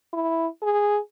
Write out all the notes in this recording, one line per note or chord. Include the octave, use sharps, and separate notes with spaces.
E4
G#4